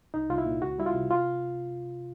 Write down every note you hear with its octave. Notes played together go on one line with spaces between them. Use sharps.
C2 D#4
C2 F4
E4
A#2
C#2 F#4
G3 E4
F4
C3
F4